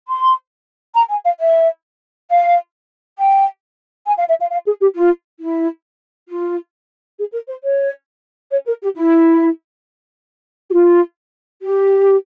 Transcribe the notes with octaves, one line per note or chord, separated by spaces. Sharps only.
C6
A#5
G#5
F5
E5
F5
G5
G#5
F5
E5
F5
F5
G#4
G4
F4
E4
F4
G#4
A#4
C5
C#5
C#5
A#4
G4
E4
G4
F4
G4